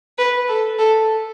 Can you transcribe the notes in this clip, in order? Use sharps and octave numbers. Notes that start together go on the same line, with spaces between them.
B4
A4
A4